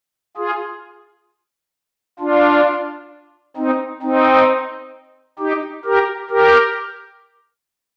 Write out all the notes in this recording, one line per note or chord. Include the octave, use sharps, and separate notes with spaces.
F4 G#4
D4 F4
C4 D#4
C4 D#4
D#4 G4
G4 A#4
G4 A#4